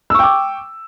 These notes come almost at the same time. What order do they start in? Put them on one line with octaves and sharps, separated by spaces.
E6 C#6 G5 D6